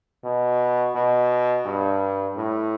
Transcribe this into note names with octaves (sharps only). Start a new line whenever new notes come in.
B2
B2
G2
A2